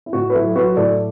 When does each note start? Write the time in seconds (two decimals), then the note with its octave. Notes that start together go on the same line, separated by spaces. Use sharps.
0.06 E4
0.13 A2 F#4
0.30 B4
0.34 F#3 E4 A4
0.56 F#3 F#4 B4
0.77 A2 A4 D5